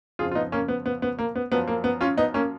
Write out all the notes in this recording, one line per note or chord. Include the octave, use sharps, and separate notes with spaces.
F2 C#3 F3 F4 G#4
F4
B3 D#4
A#3 C#4
B3
B3
B3
A#3
B3
F#2 F3 B3
A#3
B3
C#4 F4
B3 D#4
A#3 C#4